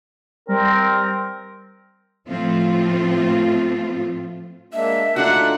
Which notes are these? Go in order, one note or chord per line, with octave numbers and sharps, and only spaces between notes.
G3 C4 A#4
A2 F3 A3 C4 F4
G#3 A#3 D4 E5
D3 A3 D4 D#4 F4 F#4 F#5